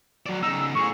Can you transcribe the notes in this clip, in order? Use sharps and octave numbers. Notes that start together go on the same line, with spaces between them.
F#3 D5
C#3 D#4 E6
A2 G#4 C#6